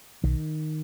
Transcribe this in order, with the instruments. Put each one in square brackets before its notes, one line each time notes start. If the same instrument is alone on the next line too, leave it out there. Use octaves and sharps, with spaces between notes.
[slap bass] B1 D#3